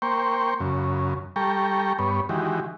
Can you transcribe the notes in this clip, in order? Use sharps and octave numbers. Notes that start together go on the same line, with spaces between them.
A#3 C5 G5 C#6
F#2 C#3
G3 A4 G5 A#5 C#6
G2 B3 C#5
D#3 E3 G#3 F#4 G4